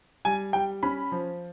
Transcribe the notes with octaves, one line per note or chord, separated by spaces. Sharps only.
G3 G#5
G3 G5
C#4 B5
F3